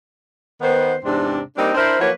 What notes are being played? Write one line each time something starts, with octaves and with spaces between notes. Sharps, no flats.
D#3 B3 C5
E2 G#2 C3 C4 D4
G3 A#3 C4 D4 D#4
D4 E4 A#4 C5
F3 F#3 A#3 E4 B4 C#5